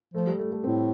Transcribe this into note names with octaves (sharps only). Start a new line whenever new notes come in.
F3 A3
G3
A3
A3
A2 C4